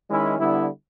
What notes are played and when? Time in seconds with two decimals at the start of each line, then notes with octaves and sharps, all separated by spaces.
0.09 D#3 G#3 C#4 E4
0.38 D3 G3 B3 E4